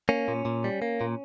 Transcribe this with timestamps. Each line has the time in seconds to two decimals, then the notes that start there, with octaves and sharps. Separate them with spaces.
0.09 A#3 C#4
0.28 A#2
0.45 A#2
0.64 G3
0.82 A#3
1.01 A#2